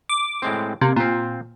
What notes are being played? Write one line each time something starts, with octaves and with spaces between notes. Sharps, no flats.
D6
A2 G#3 C4
C3 A#3
A#2 C4 F4